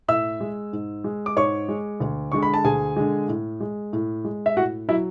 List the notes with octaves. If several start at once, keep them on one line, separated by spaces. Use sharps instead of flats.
A2 E5 E6
G#3
G#2
G#3
D6
G#2 C#5 C#6
G#3
D2
D3 G#3 C#6
B5
A5
D2 G#4 G#5
D3 G#3
A2
G#3
A2
G#3
E5
A2 F#4 F#5
F#3 E4 E5